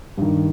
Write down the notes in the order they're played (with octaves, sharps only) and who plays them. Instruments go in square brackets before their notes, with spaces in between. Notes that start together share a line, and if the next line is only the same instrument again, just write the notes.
[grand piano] G2 D#3